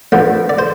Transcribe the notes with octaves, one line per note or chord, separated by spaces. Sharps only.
A1 A2 F3 B3 D4
D5
C5